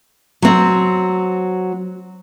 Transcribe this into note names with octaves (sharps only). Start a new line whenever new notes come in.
F#3 C4